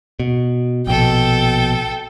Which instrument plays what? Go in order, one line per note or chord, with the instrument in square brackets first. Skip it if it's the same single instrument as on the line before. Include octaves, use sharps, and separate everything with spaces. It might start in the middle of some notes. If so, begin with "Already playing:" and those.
[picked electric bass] B2
[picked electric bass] A#1 B2 [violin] A4 G5